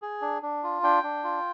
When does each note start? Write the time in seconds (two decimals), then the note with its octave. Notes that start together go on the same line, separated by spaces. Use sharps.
0.02 G#4
0.22 D4
0.42 D4
0.63 F4
0.83 D4 G5
1.03 D4
1.24 F4